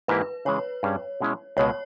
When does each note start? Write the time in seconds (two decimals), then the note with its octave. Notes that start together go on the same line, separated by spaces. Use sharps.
0.08 G#2 E3 A#3 E4 G4 B4
0.45 C#3 E3 G#3 C#5
0.83 G2 G3 C#4 G#4
1.20 B2 G#3 C#4 E4
1.57 C#2 B2 G#3 C#5